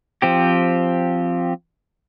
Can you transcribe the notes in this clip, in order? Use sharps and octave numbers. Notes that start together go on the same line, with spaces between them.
F3 C4 G4